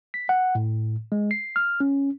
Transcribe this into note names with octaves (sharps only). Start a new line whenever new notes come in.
B6
F#5
A2
G#3
C7
F6
C#4